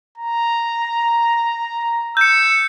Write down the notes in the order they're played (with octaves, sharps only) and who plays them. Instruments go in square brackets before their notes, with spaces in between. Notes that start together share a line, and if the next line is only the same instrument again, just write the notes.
[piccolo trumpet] A#5
[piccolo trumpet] E6 [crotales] G6 C#7